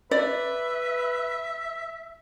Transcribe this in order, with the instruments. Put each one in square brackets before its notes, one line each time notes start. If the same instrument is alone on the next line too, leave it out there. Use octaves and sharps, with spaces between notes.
[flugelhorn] B4 [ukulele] D5 [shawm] E5